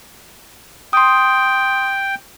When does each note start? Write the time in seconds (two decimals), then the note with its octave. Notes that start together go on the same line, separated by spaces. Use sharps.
0.93 G5 C6 D#6